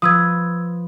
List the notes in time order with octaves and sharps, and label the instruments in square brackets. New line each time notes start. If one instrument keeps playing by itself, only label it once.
[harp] F3 B4 [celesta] D#6 E6 G#6